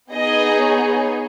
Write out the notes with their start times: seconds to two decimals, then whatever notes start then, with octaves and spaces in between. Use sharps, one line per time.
0.12 B3 D#4 G#4 D#5
0.62 C#5